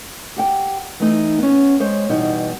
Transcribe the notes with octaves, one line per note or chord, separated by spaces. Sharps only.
G4 F#5 G5
E3 A3 D#4
B3 C#4
G#3 C5 C#5
E2 B2 G3 B3 D#4